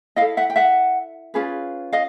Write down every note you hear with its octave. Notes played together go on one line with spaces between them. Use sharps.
E4 A4 D#5 F5
E5 F#5
G5
E5 F#5
C#4 F4 G#4 B4
D#5 F5